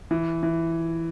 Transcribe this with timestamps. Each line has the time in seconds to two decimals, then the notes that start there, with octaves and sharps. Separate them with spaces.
0.11 E3
0.43 E3